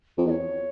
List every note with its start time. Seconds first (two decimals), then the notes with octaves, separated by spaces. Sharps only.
0.18 F2
0.26 E2 D#5
0.30 C#5